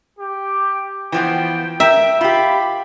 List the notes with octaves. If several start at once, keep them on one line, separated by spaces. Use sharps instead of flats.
G4
E3 F3 B3 G5
A#4 E5 G5
F4 G4 B5